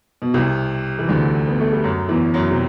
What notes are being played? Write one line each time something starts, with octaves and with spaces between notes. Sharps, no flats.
B2
C2 C3
E3
D2 D3
B3
A3
G3
F#2 F#3
E2 E3
F#2 F#3
C3